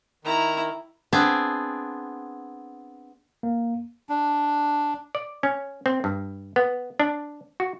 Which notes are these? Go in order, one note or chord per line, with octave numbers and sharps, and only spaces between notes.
D#3 E4 A#5
B3 C4 D4 G#4
A#3
D4
D5
C#4
C4
G2
B3
D4
F#4